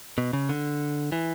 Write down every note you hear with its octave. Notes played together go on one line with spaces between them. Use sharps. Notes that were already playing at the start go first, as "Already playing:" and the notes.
B2
C#3
D3
E3